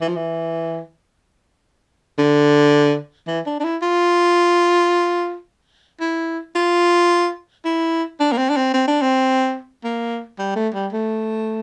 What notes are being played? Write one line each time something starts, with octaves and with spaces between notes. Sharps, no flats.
E3
F3
E3
D3
E3
D4
D4
E4
F4
E4
F4
E4
D4
A#3
C4
D4
C4
C4
D4
C4
A#3
G3
A3
G3
A3